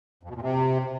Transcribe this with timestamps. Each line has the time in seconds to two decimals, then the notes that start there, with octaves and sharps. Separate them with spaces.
0.23 F2
0.29 B2
0.36 A#2
0.42 C3